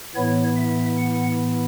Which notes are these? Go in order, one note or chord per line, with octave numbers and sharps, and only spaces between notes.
A2 E3 B3 E4 C#5
E5
F#5